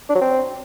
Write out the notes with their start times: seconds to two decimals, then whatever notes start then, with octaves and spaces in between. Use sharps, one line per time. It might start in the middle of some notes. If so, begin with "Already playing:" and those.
0.09 D4
0.15 F#3
0.21 C4